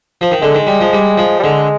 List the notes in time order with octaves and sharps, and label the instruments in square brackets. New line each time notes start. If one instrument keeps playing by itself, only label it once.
[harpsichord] F3
D#3
[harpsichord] D3 [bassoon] G#3
[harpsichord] D#3
G3
F3
G3
F3
[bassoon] G3
[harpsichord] D3 [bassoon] G#3